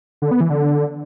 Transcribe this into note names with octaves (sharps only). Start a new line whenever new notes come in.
D3
B3
E3
D3